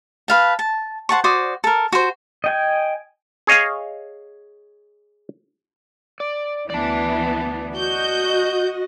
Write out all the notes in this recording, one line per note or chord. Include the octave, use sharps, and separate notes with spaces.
B4 F5 A5
A5
C5 F#5 A5 C#6
F#4 C5 D5 D#6
A4 A#4
F#4 C5
D#5 G5 G#5
G#4 C#5 D#5 F5 G#5
D5
D2 E3 B3 D5 A5
F#4 D#5 G6